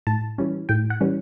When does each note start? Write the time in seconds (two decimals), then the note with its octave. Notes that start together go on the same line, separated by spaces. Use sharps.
0.07 A2 A5
0.38 E3 G3 C#4
0.69 A2 G5
0.90 F#5
1.01 E3 G3 C#4